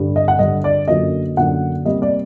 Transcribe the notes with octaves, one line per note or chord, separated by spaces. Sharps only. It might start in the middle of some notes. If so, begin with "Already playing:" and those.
Already playing: G2 D3 G3
D#5
F#5
G2 D3 G3 D#5
D5
F#2 D3 F#3 A#3 D#5
F#2 D3 F#3 A#3 F#5
C3 G3 A#3 D#5
D5